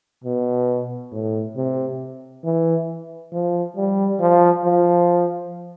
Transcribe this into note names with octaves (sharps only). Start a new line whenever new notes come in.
B2
A2
C3
E3
F3
G3
F3
F3